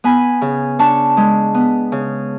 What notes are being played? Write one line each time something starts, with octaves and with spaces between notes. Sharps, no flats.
B3 G#5 B5
C#3
D4 A5 C#6
G#3
B3
C#3